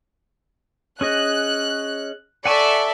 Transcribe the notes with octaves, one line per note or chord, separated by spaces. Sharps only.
C#4 G#4 D#5 F#6
A4 D5 E5 F#5 G#5 C#6